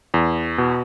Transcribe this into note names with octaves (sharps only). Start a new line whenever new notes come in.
E2
B2